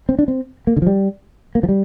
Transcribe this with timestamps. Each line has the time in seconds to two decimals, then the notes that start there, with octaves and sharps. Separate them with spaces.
0.09 C4
0.19 D4
0.28 C4
0.67 A#3
0.77 D3
0.82 F3
0.87 G3
1.55 A#3
1.63 F3
1.69 G3